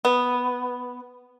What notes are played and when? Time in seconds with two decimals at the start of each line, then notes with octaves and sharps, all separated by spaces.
0.05 B3